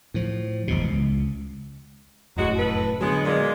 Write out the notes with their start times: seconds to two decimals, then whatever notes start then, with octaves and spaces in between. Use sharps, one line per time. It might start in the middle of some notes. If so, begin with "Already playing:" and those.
0.14 A2 F3
0.68 F1 E2 G2 B2
0.85 C#2
2.37 F1 F#2 A2 F#3 G#3 F#4
2.56 A4 B4
3.01 D3 F#3 G#3 B3
3.25 A#2 G#3